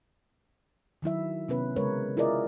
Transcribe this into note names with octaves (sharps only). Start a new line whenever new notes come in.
D#3 F#3 E4 E5
C3 B3 C#4 B4
C#3 G#3 A#4 B4 C#5
E4 F4 G#4 A#4 D5 D#5